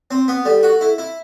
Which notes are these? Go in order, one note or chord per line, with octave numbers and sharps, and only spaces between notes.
C4
B3
G3 A4
F#4
E4
E4